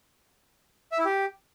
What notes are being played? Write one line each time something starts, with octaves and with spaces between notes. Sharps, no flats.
E5
E4
G4